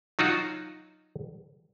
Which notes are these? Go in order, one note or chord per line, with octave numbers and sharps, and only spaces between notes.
F#3 D#4 F4 F#4